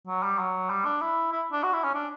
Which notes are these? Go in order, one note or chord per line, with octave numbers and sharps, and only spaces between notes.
F#3
G3
F#3
G3
D4
E4
E4
D4
F#4
E4
C#4
D4